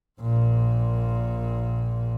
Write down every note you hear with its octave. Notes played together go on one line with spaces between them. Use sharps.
A#1 A#2